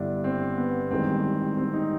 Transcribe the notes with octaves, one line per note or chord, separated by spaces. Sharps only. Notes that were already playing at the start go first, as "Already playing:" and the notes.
Already playing: G1 G2 D3 D4 E4
C4
B3
A1 G2 D#3 G#3 C4
C4
D#4